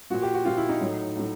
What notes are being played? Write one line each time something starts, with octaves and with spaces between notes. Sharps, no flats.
A#2 F3 F#4
G4
F#4
A#2 F3 F4
E4
D#4
A2 F#3
A2 F#3